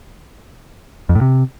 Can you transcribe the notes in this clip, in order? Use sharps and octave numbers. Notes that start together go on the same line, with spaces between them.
F2
A2
C3